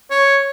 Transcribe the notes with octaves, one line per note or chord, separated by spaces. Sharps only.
C#5